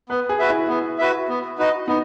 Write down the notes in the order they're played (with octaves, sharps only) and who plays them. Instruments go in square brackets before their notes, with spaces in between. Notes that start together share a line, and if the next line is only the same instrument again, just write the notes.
[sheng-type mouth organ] B3 [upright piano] B4
[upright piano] G#4
[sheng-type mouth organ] F#4 B4 E5
[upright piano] E4
[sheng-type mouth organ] B3
F#4 B4 E5
B3
D#4 F#4 B4 D#5
[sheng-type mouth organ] B3 [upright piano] D#4